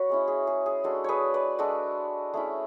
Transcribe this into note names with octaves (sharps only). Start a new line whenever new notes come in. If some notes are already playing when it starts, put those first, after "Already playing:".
Already playing: F#4 B4 C#5
G#3 C#4 E4
G#4
G#4
G#4
G#3 D4 F#4 A4
G#4 B4 C#5
B4 D5
G#3 D4 F#4 A4
A3 C#4 E4 G#4